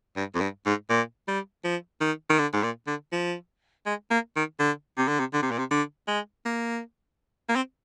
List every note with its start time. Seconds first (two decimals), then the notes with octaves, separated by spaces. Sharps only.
0.16 G2
0.35 F2
0.41 G2
0.66 G#2
0.90 A#2
1.28 G3
1.65 F3
2.01 D#3
2.30 D#3
2.39 D3
2.53 G#2
2.63 A#2
2.87 D3
3.12 F3
3.86 G#3
4.11 A#3
4.36 D#3
4.60 D3
4.97 C3
5.08 D3
5.19 C3
5.34 D3
5.43 C3
5.51 A#2
5.59 C3
5.71 D3
6.08 G#3
6.46 A#3
7.49 A#3
7.56 C4